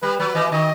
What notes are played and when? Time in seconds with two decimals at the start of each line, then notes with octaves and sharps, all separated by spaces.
0.02 G3 B4
0.19 F#3 B4
0.35 E3 D#5
0.52 D#3 D#5